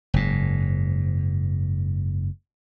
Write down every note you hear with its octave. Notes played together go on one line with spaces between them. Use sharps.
F#1 G#2